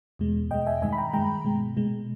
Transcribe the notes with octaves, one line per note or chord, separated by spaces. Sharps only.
E2 B2 G#3
E2 B2 G#3 D#5 G5
E5 G#5
G2 D#3 G#3 E5 G#5
B5
G5 A#5
G2 D#3 G#3 G5 A#5
B2 G#3
B2 G#3